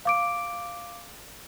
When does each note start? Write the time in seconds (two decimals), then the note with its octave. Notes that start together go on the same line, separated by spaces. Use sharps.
0.05 F5 D6 D7